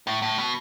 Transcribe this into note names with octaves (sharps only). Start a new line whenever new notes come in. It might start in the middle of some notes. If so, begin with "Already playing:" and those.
A2
A2
B2